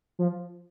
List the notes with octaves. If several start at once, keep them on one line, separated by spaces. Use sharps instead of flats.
F3